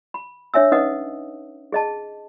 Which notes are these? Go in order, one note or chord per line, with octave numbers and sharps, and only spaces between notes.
B5
D4 C#5 E5 G#5 E6
C#4 D#4 B4 D#5 F#5 D#6
G#4 D#5 A5